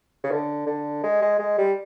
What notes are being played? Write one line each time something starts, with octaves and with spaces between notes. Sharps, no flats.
C#3
D3
D3
G#3
G#3
G#3
G3